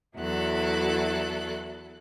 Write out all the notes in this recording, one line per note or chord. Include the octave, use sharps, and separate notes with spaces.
E2 F#3 E4 F#4 A4 F#6